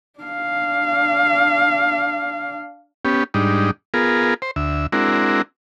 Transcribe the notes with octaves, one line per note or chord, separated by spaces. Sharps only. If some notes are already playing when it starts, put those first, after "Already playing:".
D4 F5
B3 C#4 G4
G#2 G3 D4 D#4
B3 F4 G#4 A#4
C5
D2 E5
G#3 C4 D4 E4 F#4 A#4